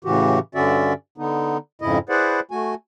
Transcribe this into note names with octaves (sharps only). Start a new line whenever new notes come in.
A2 C#3 E3 F#4 G4
G2 D3 C#4 F#4 D5 E5
D3 B3 D#4
F2 G#2 C#3 E4 D#5
E4 G#4 B4 C5 D5 F#5
A3 F#4 G#5